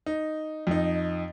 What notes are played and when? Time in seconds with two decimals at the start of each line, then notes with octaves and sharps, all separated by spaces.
0.06 D#4
0.67 F2 D#4